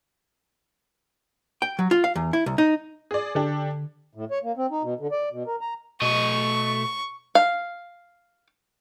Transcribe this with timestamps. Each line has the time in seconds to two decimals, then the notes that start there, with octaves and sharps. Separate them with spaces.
1.62 G5
1.79 F#3
1.91 F4
2.04 F5
2.16 E2
2.33 E4
2.46 C2
2.58 D#4
3.11 G#4 D5
3.35 D3 D4 G4 A4
4.15 A2
4.31 C#5
4.43 A#3
4.57 C4
4.71 D#4
4.83 B2
5.00 D3
5.12 D5
5.32 B2
5.47 A#4
5.61 A#5
6.02 B2 A3 D#5 C#6
7.35 F5